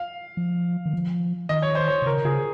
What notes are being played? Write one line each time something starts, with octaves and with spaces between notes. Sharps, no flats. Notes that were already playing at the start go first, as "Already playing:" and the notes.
Already playing: F5
F3
D#3
F3
D#3 D#5
C#5
C5
C#5
C3
C#3 A#4
C#3 G#4